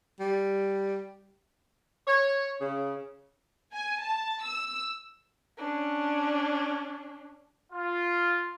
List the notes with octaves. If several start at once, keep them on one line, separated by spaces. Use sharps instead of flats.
G3
C#5
C#3
G#5
A5
E6
C#4 D4
F4